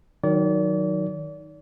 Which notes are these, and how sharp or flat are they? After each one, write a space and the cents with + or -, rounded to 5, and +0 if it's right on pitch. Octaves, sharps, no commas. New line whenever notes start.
D#3 +0 F#3 +0 D5 -35